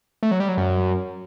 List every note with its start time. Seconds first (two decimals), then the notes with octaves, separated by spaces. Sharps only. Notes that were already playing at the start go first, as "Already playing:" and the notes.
0.23 A3
0.31 F#3
0.40 G3
0.49 F#3
0.58 F#2